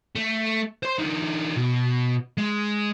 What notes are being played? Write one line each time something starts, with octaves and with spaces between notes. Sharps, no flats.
A3
C5 C6
D3 D#4
B2
G#3